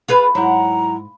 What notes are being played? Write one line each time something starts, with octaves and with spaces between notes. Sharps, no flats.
F4 G#4 B4
G#2 F#3 E4 F#5 A#5